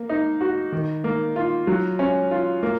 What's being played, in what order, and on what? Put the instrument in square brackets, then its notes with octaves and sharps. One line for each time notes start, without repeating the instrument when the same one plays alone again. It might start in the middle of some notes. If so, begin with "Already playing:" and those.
Already playing: [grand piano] A#3
D#4
F#4
D#3
A#3
F4
F#3
C#4
F4
A#3